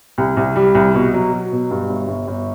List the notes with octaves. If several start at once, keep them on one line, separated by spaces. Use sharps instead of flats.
C2
C2
G3
C2
B2
F#3
F#3
B2
G2
G1
G1
G1